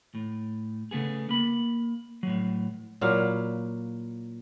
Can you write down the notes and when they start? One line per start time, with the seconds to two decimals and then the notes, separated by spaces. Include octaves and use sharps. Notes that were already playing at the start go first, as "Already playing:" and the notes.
0.15 A2
0.91 C#3 A3 B3 G#4
1.29 A#3 B5
2.23 A2 F#3
3.01 A#2 F#3 E4 F5